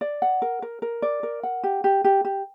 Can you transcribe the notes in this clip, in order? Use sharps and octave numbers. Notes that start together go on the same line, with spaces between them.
D5
F#5
A#4
A#4
A#4
D5
A#4
F#5
G4
G4
G4
G4